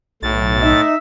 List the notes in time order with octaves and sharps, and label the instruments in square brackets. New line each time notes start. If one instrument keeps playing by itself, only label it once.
[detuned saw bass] B1 [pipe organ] A2 A6
[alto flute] D#4 [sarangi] E5